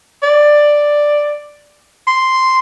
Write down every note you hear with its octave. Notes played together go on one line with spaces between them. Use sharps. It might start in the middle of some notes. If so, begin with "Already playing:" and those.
D5
C6